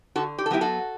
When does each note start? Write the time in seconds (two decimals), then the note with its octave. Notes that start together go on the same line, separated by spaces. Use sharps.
0.15 D3 F#4 A4
0.38 G4
0.46 A4
0.51 F#3 B3 E4 G4
0.61 F#4 A4